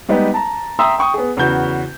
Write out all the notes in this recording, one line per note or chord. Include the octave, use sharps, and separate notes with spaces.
G3 G#3 B3 D#4 G4
A5 A#5
E5 G5 A#5 C6 D#6 E6
G5 C#6 D#6
B3 G#4
E2 C#3 B3 F#4 G6